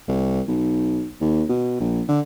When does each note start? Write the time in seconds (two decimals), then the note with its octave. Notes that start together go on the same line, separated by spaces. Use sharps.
0.08 C2
0.48 B1
1.21 D#2
1.49 B2
1.80 A#1
2.08 D3